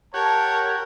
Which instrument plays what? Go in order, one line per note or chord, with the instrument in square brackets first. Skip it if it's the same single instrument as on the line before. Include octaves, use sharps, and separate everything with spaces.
[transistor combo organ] G4 F#5 [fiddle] A#4 [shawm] C#5 [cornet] A5